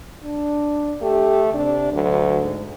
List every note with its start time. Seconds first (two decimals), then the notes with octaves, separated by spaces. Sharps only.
0.24 D4
1.02 A3 G4
1.54 C3 D4
1.93 D2 F#3
2.41 G#2